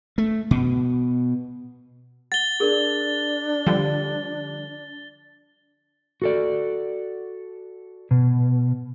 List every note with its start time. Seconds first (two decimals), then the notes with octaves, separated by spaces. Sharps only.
0.18 A3
0.51 B2
2.32 F#5 A6 G7
2.60 D4 G#4 A#4 D5
3.66 D3 F3 G3
6.22 F#4 A4 D5
8.11 B2